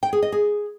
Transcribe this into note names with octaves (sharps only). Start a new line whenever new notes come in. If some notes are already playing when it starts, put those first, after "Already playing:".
G5
G#4
D#5
G#4